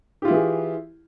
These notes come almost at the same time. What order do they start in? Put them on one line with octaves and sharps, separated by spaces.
G4 F4 E4 E3 G#4